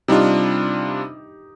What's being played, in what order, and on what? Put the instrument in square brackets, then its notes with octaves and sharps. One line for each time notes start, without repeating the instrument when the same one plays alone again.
[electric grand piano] C3 G3 D4 F4 [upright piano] D#4 G4